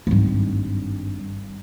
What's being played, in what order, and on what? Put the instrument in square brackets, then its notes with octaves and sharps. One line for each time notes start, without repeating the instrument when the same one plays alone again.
[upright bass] G#1 G2